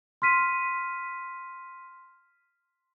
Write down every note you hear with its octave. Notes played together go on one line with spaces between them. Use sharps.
C6 F6 B6 D#7